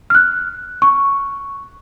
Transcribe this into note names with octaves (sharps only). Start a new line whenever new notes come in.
F6 F#6
C#6